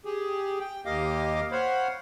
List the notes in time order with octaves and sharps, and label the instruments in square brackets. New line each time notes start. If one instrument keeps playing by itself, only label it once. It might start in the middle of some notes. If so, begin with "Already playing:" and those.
[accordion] G4 G#4
G5
D#2 A#3 G4 D#5 F5 D6
C5 C#5 F5 F#5 B5